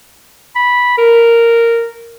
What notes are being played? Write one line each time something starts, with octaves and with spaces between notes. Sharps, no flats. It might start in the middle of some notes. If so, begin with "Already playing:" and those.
B5
A#4